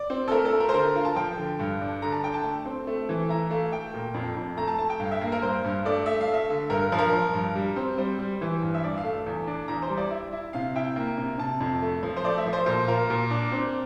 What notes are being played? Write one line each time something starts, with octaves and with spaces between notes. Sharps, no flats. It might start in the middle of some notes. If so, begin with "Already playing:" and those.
Already playing: D5
C4
A4
A3 A#4
A4
A3
A#4
C5
D3 A#4
F4
A5
F3 G5
D3
G2
D4
D3 A#5
A5
D4 G5
A5
A3
C4
A3
E3
E4 A#5
A3 F5
A3 G5
A#2
F2
F2
A3 A#5
A5
A3 A5
G5
G2 F5
E5
A#3 F5
A#4
G2 C5
G2
A3 D5
A3 E5
F5
A3
E5
D3
G2 A#4
F3
A#4
F3
G2
G3
C4
G3 C5
G3
E3
G2
E5
G2 D5
F5
A3
E2
D4
E2 A#5
C5
G3
D5
E4 E5
E4
C3 F5
E4 G5
A#3
C3
C3 A5
F2
A3
F3
C5
A3 D5
E5
F3
C5
A#2 C5
F4 A#4
A#2
D4
C4